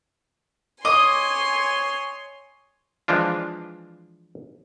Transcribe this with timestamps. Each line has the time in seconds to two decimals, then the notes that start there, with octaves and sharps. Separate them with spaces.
0.85 C#5 D#5 G#5 C6 D6 D#6
3.08 E3 F3 G#3 D4 F4